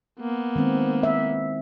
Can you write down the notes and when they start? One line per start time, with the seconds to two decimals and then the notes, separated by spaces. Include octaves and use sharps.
0.21 A#3 B3
0.56 D#3 G#3 C4
1.03 E5